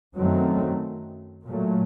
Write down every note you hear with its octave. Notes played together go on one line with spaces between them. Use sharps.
F#2 D#3 F#3 A3 C4
A#2 F#3 A3